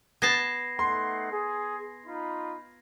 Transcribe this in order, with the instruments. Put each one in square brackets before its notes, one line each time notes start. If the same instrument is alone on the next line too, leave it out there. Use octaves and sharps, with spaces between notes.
[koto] B3 A5 [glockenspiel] G#6 A#6 C7
[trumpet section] A3 D#4 F#5 [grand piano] C6
[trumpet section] G#4
D#4 F4 B5